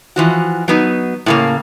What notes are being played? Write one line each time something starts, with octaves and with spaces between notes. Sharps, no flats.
E3 F3 F#4
F#3 B3 D#4
A2 C#3 A#3